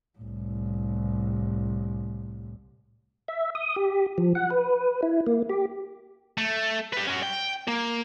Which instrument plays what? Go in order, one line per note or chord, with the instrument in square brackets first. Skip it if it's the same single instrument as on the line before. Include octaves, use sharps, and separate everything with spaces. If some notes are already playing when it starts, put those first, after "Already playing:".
[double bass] C2 A2
[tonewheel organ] E5
D#6
G4
F3
F#5
B4
E4
A#3
G4
[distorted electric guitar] A3
G4 B4
C#4 F#4
G5
A#3